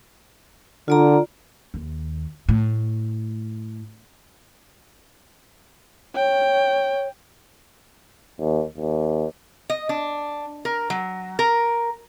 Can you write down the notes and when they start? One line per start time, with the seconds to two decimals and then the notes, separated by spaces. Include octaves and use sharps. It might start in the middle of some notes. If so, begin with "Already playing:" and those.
0.88 D3 F4 D5 A#5
1.74 D#2
2.49 A2
6.15 C#5 G5
8.40 D#2
8.77 D#2
9.70 D#5
9.89 D4
10.65 A#4
10.90 F#3
11.39 A#4